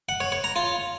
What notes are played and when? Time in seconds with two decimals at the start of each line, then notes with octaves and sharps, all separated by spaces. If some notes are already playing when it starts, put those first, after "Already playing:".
0.09 F#5
0.20 C#5
0.32 C#5
0.44 A#5
0.56 F4